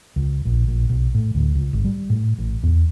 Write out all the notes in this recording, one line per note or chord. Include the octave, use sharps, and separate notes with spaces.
C#2
A#1
A#1
B1
A2
D2
C#2
G#1
G3
A2
A1
E2